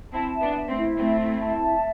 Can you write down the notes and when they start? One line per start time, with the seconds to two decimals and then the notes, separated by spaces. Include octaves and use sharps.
0.13 C4 E4 A5
0.34 E5
0.41 B3 D4
0.56 E5
0.69 A3 C4
0.77 E4
0.98 A3 C4 E5
1.20 E4
1.40 A5
1.62 E5